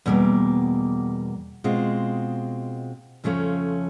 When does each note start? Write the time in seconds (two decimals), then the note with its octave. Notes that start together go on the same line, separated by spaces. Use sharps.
0.06 E2 B2 G3 A#3
1.64 B2 G#3 C4 F4
3.24 F2 C#3 F3 A3 C#4